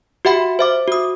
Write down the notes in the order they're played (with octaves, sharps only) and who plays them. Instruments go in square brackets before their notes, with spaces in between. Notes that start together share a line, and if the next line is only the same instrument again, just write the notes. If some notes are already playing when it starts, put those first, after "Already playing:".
[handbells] F#4 G4 E5 F#5 B5
C5 E5 D6
F#4 D#6